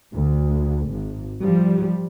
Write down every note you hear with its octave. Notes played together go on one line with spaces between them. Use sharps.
D2
G#1
F3 G3